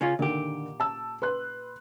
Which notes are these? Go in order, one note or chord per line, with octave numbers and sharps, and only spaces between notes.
C#3 C#4 F4
A#2 D3 D#3 G4
A5 E6
B4 C6 F#6